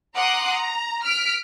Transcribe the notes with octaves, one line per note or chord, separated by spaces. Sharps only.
F#5 A#5 C6 D6 D#6 F#6
A#5
F6 B6 D7